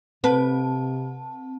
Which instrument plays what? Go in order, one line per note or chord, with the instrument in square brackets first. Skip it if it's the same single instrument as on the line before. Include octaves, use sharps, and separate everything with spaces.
[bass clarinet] C3 [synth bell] C4 A5 [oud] B4